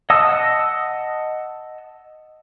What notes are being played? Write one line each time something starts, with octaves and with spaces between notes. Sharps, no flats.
D#5 F#5 A5 D#6 E6